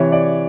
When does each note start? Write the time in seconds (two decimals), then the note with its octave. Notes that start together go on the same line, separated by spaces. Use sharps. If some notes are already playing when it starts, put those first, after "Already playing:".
Already playing: C3 E3 C#5
0.12 D5